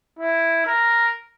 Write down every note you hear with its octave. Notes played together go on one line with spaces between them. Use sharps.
E4
A#4